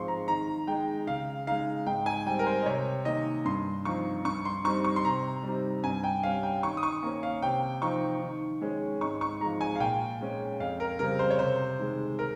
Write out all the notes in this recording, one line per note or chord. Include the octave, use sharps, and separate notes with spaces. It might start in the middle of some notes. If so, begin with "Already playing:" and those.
Already playing: G#2 F3 G#3 C4 C6 C#6
A#5
D#3 A#5
G#3 D#4 G5
C#3 F5
G#3 D#4 F5
G#2 G5
G#5
G3 C4 G5
A#4
C5
D#5
C3 C#5
D#3 A#3 D#5
G2 C6
F3 C4 D#4 C#6
G2 C#6
C6
G3 C4 D#4 C#6
C#6
C6
C3 A#5
G3 C4 D#4
G2 G#5
G5
G3 C#4 F5
G5
D#3 C#6
D#6
C#6
A#3 C#4
F5
C3 G5
F3 C4 D#4 C#6
D#3
G#3 C#4
G#2 C#6
C#6
F3 G#3 D#4 A#5
G#5
F5
A#2 G5
G#3 C#4
F2 F5
A#4
C#3 G3 C4 A#4
C5
C#5
C3 C5
D#3 G#3
A#4